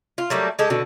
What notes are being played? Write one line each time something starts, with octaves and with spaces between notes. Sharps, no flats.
F4
F#3 G3 A3 A#3
G#3 G4 A4
B2 D3 F#4